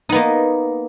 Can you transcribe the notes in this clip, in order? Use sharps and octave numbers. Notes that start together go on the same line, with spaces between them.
A#3 B3 D#4